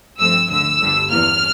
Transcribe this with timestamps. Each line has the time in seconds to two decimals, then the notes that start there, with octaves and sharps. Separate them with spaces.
0.18 G2 F3 A3 C4 E6
0.49 D2 D3 A3 E6
0.79 G1 G2 D3 G3
1.10 E2 E3 A#3 F6